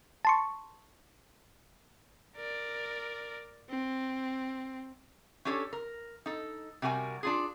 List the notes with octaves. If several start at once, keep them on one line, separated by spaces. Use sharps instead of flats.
A5 C6 C#6
A#4 D5
C4
C#4 D4 G4 A4 C#5
A#4
D#4 A4
C3 G3 F#4 A#4 G#5
D4 F4 G#4